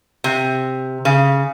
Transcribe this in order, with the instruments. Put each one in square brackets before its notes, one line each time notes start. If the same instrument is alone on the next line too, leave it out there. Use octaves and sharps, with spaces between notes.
[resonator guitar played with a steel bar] C3
C#3